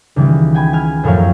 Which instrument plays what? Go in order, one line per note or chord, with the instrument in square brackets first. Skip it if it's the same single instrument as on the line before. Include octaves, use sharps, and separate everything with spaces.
[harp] C#2 D#3 E3 G3
G5 G#5 B5 G#6
G#5 F6 G#6
F#2 A2 F3 A#4 C#5 F5